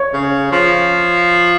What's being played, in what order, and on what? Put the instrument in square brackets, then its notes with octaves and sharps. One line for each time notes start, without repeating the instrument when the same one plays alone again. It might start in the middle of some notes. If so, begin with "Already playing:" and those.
Already playing: [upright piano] C#5
[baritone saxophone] C#3
F3